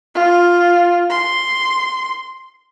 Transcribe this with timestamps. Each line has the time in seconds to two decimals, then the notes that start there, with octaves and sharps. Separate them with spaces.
0.15 F4
1.10 C6